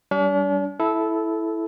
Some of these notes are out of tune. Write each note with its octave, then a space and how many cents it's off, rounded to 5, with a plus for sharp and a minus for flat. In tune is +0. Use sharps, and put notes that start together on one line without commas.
G3 -15 D4 -45
E4 +0 A4 -15